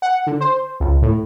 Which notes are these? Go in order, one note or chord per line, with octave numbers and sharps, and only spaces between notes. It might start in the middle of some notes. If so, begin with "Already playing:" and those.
F#5
D3
C5
C#2
A2